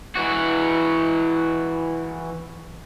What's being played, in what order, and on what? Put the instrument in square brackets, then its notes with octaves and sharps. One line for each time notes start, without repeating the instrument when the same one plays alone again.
[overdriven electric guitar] E3 F#4